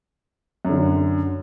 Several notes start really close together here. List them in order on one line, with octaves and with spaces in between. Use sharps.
F#2 D3 F#3